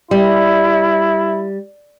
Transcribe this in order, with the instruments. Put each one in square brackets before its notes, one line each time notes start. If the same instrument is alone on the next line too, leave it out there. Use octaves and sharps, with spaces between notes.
[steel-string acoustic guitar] G3 [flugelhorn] E4